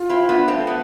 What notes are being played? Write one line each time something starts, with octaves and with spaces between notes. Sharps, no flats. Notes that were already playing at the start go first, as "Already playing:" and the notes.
Already playing: F4
C4 E4
B3 D4
A3 C4
B3